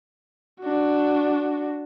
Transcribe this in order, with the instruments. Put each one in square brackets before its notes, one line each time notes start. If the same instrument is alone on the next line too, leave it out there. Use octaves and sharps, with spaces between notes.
[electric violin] D4 F#4